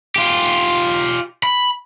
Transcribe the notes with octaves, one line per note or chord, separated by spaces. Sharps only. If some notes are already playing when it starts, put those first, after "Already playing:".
F4 G4
B5